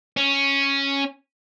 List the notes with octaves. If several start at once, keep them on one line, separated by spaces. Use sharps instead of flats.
C#4